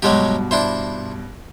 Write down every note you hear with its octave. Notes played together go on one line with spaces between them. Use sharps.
G2 B2 F#3 G#3 G4
D4 E4 C5